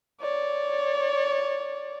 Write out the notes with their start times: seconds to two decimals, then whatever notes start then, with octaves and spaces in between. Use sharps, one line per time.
0.21 C#5 D5